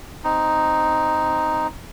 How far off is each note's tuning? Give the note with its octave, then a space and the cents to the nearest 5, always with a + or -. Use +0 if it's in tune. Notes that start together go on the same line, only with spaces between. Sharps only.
C4 +0 D#4 +0